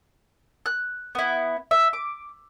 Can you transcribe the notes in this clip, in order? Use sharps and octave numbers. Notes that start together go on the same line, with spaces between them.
F#6
B3 E4
E5
D6